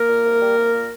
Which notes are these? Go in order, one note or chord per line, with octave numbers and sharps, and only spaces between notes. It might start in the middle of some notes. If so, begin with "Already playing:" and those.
Already playing: A#3 A#4
A#2
C2
G3
C2
A#2